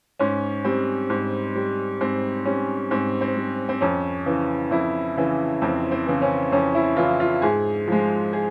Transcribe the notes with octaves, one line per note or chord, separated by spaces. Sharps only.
G#2 C#4
G3 C4
G#2
G3
G#2 C4
G3 C#4
G#2 C4
C4
G3
C4
F2 C#4
C#3 E3
F2 E4
C#3 E3
F2 C4
C4
C#3 E3
C#4
F2 C#4
E4
C#3 E3 F4
F4
G#2 G#4
F3 G#3
G#4